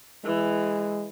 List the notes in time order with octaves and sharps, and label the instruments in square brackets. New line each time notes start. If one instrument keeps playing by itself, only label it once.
[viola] E3 [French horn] G#3